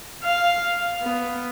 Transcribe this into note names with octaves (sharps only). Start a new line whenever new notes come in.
F5
B3